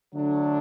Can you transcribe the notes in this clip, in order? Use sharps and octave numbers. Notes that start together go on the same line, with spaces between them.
D3 F#3 A3 D4